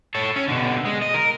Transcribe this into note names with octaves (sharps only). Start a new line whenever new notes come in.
A4 C#5
C#4
B2 D3
G#3
D#5
A#4